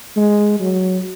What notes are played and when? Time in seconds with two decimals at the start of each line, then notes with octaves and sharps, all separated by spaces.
0.16 G#3
0.60 F#3